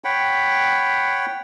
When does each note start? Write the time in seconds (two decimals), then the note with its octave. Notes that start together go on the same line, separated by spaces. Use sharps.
0.04 C#5 F#5 G5 B5